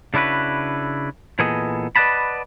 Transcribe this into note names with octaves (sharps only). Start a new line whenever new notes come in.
C#3 D4 E4 F#4 B4
A#2 E3 B3 G#4 A4 D#5
B4 D5 D#5 F#5 A5 B5